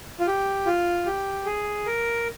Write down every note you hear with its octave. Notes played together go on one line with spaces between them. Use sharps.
F4
G4
F4
G4
G#4
A#4